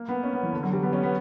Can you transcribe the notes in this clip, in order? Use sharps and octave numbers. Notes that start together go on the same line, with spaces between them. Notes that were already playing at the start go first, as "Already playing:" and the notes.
Already playing: A#3
B3
C#4
B3
E3
D3
F#3
G3
B3
C#4
B3